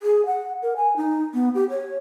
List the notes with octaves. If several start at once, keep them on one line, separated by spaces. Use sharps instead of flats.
G#4
F#5
A#4
G#5
D#4
B3
G4
C#5